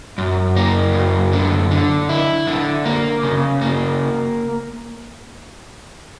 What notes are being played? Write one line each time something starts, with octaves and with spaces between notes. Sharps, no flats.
F#2
A#3
F#2
D3
D3
E4
D3
A#3
C#3
A#3